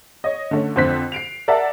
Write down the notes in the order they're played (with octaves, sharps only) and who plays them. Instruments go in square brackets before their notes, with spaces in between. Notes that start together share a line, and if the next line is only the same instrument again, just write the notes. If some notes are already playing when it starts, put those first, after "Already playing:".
[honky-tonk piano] C#5 D#5
D3 A3 C#4
F2 D3 C5 F#6 B6
C7 D7 F7
A#4 D5 E5 F#5 A5